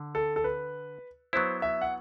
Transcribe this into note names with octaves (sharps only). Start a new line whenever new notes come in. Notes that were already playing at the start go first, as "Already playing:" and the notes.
Already playing: D3
A4
A4
B4
F#3 B3 E4 C5
E5
F#5